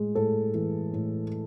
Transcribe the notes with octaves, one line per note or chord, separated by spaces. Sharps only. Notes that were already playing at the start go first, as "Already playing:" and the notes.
Already playing: A2 G#3
A2 A4
E3
A2